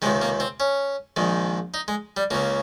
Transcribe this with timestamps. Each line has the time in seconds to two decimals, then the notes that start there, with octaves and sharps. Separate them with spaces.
0.02 C#2 C3 D#3 G#3
0.22 A#3
0.40 C4
0.60 C#4
1.16 A#1 G#2 D#3
1.74 D#4
1.88 G#3
2.17 G3
2.31 C#2 C#3 A#3